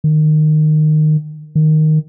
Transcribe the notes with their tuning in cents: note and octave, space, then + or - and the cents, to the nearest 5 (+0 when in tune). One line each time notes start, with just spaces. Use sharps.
D#3 -20
D#3 -5